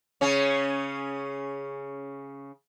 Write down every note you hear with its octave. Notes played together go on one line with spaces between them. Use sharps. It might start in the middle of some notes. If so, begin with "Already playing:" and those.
C#3 C#4